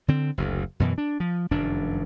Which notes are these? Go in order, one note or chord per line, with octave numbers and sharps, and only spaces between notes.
D3 C4
F#1 D2
F#2 B2 E3
D4
F3
F1 F#2 D#3 D4